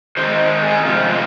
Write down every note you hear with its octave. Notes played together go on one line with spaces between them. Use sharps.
D#3 G#3 C4 D#4 C5
G#4
C3 F3 G#3 C4 D#4 F4